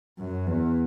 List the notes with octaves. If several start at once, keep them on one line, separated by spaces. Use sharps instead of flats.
F#2
E2